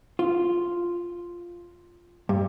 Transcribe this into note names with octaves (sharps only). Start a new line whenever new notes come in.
F4
G2